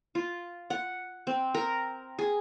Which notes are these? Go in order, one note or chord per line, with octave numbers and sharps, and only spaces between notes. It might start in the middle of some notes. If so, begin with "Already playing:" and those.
F4
F#5
C4
A#4
G#4